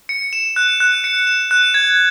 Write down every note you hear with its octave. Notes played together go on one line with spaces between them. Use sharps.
C#7
E7
F#6
F#6
C#7
E7
F#6
G#6